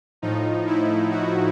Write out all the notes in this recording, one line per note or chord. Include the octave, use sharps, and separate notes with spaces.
A2 F3 D#4
E4
F#4